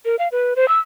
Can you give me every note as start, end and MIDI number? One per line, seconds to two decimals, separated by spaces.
0.05 0.16 70
0.19 0.28 77
0.32 0.54 71
0.56 0.68 72
0.68 0.79 88